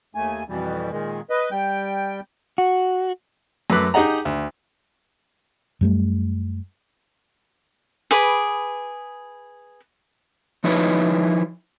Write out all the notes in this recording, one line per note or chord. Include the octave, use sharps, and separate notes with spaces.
D#2 A3 G#5
F2 B2 E3 G3
A#2 D#3 G#3
B4 D#5
G3 G5 G6
F#4
F#2 A3 B4 D6 F#6
D#4 G4 G#4 D#5 F#5 A#5
D2
F#2 G3 A3
G#4 B4 B5 D6
F3 D#4 E4 B4 C#5